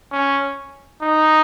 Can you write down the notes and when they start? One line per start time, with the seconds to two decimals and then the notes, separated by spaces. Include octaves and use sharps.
0.12 C#4
1.02 D#4